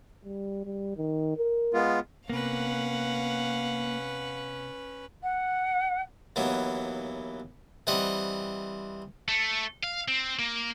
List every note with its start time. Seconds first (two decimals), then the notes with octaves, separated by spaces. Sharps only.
0.24 G3
0.65 G3
0.97 D#3
1.37 A#4
1.74 G#3 B3 F4
2.30 C3 A#3 B3 C#4 B4 F5 F#5
5.23 F#5
6.36 D#2 E3 F#3 B3
7.87 E3 G3 C4 D#5 F#5
9.28 A3
9.84 F5
10.08 C4
10.39 A#3